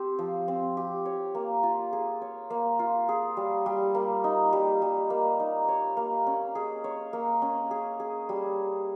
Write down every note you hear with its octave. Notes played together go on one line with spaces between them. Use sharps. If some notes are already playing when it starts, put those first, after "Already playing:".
Already playing: C4 G4 C5
F3
C4
G4
C#5
A#3
F4
G#4
C#5
A#3
F4
G#4
G3
G3
A#3
D#4
G3
G3
A#3
D#4
C#5
A#3
C#4
G#4
C#5
A#3
C#4
G#4
G#4
G3